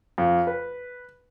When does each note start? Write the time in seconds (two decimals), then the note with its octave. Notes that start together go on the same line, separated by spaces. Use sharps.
0.18 F2
0.47 B4